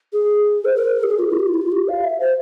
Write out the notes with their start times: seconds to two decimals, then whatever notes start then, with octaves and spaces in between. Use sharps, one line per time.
0.13 G#4
0.65 C5
0.76 A#4
1.03 G4
1.08 G#4
1.19 F4
1.30 E4
1.40 G4
1.47 F4
1.54 E4
1.61 F4
1.72 G4
1.88 F5
2.04 E5
2.20 C5